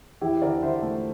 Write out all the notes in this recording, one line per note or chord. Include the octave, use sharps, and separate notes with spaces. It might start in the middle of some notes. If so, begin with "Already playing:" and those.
E2 E4 G4
D3 A#4 D5
D3 C5 E5
A3